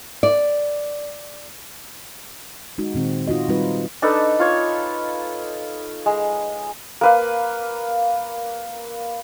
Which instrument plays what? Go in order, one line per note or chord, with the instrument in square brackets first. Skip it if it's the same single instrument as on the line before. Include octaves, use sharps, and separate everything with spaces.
[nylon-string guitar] D5
[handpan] G#3 D#4 F#4
A#2 D#3 C4
D#4 F4 F#4 D#5
G3 C4 D#4 F4 B4
[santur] D4 D#4 A4 B4
F4 C#5
G#3
A#3 B4 F5